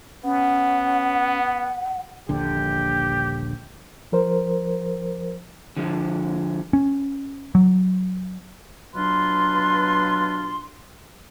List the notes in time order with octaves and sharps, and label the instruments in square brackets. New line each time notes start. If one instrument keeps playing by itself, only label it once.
[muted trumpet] B3 [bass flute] C#4 [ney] F#5
[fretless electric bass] D#1 A#1 D3 [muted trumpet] G4
[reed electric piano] F3 A#4 C5
[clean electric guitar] D3 F3 G#3
[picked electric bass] C#4
F#3
[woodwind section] B2 F#3 D4 F4 B4 C6